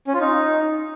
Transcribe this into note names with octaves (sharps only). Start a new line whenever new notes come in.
C#4
F4
D#4